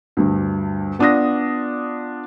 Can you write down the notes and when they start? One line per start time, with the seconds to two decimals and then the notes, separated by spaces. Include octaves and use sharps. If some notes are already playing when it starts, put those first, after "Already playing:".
0.17 D2 G2
0.99 B3 D4 F4 D#6 A#6